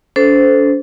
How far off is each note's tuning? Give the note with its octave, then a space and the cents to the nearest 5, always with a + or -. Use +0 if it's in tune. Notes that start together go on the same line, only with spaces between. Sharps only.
D4 -45 A4 -5 C5 -15